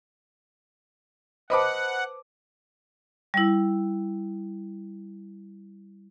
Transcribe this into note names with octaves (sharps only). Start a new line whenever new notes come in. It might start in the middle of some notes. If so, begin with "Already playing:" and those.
B4 C5 D#5 F#5 A5 B5 D6
G3 E4